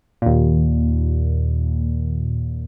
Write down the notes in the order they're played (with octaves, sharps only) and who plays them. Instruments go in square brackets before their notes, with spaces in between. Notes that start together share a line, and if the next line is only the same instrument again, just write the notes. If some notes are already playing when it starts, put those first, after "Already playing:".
[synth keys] D#2 A#2